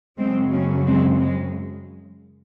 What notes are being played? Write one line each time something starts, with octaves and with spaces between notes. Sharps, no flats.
F#2 C#3 F#3 G#3 C4
A#3 C#4
G#3 C4
G#3